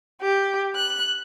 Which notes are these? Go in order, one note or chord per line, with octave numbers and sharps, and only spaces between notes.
G4
F#6